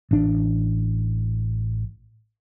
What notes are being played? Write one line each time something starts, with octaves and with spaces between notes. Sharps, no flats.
A1 D4